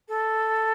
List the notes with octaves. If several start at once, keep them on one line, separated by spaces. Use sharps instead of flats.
A4